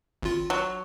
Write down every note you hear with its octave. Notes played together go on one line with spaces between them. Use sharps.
G#1 F4
F#3